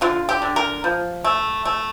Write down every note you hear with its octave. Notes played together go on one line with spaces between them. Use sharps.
D3 F4
G4
D3
A#4
F3
A3
A3